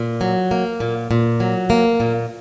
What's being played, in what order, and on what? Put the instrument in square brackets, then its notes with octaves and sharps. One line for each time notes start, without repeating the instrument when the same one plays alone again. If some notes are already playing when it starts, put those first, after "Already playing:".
Already playing: [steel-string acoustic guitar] A#2
F#3
A#3
A#2
A#2
F#3
A#3
A#2